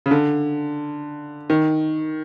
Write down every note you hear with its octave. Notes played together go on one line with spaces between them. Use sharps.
C#3
D3
D#3